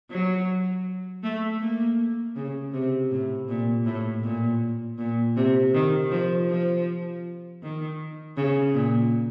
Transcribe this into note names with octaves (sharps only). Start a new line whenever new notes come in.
F#3
A3
A#3
C#3
C3
A2
A#2
A2
A#2
A#2
C3
D#3
F3
F3
D#3
C#3
A#2